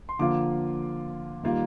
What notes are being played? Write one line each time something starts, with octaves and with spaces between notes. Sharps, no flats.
C6
D3 F3 A#3 F4 D6
D#3 G3 A#3 F4